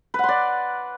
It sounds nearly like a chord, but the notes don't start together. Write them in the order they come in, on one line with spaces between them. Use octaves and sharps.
B4 F#5 C6 D5